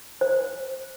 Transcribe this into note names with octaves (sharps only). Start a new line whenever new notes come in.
C5